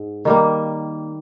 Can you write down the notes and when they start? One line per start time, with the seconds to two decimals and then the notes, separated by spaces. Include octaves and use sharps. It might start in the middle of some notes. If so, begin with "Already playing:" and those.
Already playing: G#2
0.25 D#3 G3 A#3